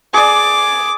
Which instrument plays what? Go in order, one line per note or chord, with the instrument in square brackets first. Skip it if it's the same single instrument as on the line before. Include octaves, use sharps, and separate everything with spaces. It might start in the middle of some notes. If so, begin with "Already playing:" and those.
[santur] G#4 D5 [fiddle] D6